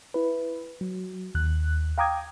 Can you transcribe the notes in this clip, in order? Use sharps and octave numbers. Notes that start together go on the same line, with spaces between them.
E4 B4
F#3
D#2 F#6
F5 G5 A#5 D6 D#6 G#6